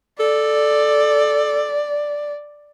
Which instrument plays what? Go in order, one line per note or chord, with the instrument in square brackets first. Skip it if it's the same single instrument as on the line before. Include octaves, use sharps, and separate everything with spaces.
[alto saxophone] A4 [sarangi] D5